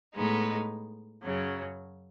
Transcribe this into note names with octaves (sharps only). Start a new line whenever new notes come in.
A2 G#3 B3 D#4
F#2 C#3 F#3